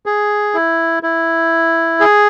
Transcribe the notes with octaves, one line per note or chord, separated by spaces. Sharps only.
G#4
E4
E4
G#4